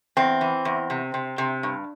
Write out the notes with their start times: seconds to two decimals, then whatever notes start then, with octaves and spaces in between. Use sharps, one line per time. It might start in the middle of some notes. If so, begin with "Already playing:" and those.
0.17 E2 C4
0.41 E3
0.65 E2
0.90 C3
1.14 C3
1.38 C3
1.63 G2